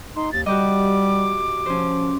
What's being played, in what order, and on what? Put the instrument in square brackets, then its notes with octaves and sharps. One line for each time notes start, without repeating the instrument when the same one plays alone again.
[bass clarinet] D#4 [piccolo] C6
[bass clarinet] D#2 [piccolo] A6
[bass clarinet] G3 [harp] F#4 G4 D#5 [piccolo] D6
[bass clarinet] F3 [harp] C#4 C5